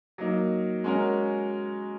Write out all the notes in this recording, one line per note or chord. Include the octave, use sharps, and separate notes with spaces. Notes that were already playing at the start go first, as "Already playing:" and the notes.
F#3 A#3 D#4
G#3 C#4 F#4 A#4